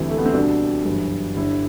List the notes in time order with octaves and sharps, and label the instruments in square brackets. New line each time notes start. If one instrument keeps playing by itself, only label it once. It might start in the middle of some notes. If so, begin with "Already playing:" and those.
Already playing: [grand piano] D2 C3 E3 G3 E4
A3
B3
C4
C2 B2 G3 D4
G1 F#2 E3 G3
G1 G2 D3 G3 E4